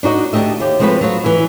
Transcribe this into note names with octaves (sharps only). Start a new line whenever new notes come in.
D4 D#4 F#4 D#5
D2 D4 G4 D#5 E5
D#2 G4
F3 G#3 C4 E4 F#4 B4
F#3 F4 F#4
E3 E4